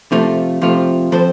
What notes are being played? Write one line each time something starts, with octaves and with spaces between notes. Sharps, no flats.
C3 F3 A3 F4
C3 F3 A3 F4
F3 C4 A4 C5